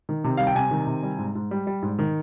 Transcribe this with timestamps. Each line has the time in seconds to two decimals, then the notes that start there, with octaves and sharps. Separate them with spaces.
0.09 D#3
0.24 C3
0.37 G3 F5
0.47 G5
0.55 C3 G#5
0.71 D#3
0.87 C3
1.03 G3
1.18 G#2
1.35 G#2
1.51 G3
1.67 G3
1.83 G#2
1.99 D#3